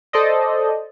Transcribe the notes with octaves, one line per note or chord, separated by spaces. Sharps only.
A4 C5 D5 D#5